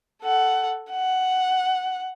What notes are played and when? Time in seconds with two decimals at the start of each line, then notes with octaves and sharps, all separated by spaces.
0.22 A4 F#5
0.91 F#5